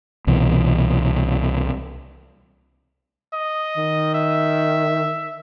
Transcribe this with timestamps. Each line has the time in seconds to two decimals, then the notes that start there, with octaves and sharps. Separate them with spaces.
0.27 C2 B2 E3
3.33 D#5
3.77 D#3
4.15 E5